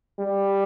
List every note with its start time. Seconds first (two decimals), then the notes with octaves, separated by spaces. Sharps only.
0.19 G3